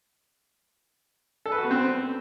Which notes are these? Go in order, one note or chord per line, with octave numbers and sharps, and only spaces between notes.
A4
B4
F#4
B3
C4